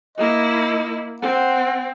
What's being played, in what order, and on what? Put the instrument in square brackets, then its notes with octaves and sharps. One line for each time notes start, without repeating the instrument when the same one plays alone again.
[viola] A#3 E4 [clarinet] D#5
[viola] C4 [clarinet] F#5